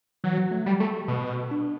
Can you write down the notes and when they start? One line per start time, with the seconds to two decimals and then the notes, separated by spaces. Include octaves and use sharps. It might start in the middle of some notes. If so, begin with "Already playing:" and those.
0.24 E3 F#3
0.38 F#3
0.51 A3
0.66 G3
0.80 A3
1.08 B2
1.51 D4